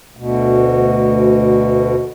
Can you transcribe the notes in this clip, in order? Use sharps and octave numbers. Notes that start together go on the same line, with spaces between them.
D2 B2